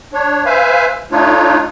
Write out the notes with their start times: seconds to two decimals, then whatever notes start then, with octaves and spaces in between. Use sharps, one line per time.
0.13 D4 C#5
0.46 B4 C5 E5 F5 G#5
1.12 A3 D4 D#4 F4 C#5